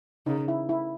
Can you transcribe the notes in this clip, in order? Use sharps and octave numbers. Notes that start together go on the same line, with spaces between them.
C#3 D#4
E4
E4